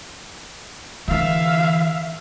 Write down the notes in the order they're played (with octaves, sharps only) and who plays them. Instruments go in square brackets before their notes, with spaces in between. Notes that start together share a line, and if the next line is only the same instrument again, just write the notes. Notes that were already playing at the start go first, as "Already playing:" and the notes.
[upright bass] D3 E3 [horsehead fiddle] E5 F5